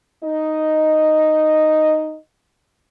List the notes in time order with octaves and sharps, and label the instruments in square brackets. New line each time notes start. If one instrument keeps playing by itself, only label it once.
[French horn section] D#4 D#5